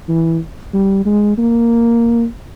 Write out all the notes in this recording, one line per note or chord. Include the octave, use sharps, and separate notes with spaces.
E3
G3
G#3
A#3